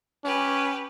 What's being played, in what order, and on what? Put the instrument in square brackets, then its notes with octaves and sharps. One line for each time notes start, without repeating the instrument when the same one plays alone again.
[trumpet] C#4 [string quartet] G4 B4